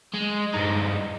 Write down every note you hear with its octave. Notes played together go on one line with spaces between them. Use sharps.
G#3
G2 D#4